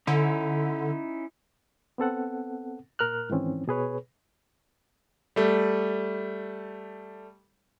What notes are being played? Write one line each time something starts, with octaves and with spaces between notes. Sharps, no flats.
D3 C#4 D#4 E4
B3 C4 A4 F#5
A#2 A#4 F6 F#6
G#2 D#3 E3 C4 C#4
B2 G#4 B4 C#5
G3 A3